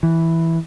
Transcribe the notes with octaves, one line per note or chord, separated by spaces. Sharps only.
E3